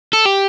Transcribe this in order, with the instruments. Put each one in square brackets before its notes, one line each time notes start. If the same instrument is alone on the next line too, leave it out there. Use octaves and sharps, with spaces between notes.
[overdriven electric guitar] A4
G4